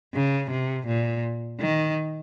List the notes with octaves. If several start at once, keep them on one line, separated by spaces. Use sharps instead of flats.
C#3
C3
A#2
D#3